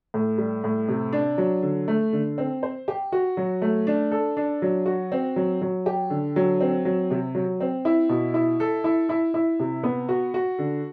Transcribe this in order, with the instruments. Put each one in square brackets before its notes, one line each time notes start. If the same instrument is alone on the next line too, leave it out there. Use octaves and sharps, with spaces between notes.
[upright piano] A2
G3
A2
C3
D4
F#3
D3
A3
D3
C4
C5
G4
F#4
F#3
A3
D4
A4
D4
F#3
F#4
C4
F#3
F#3
G4
D3
F#3
C4
F#3
C3
F#3
C4
E4
B2
E4
A4
E4
E4
E4
C3
B3
F#4
F#4
D3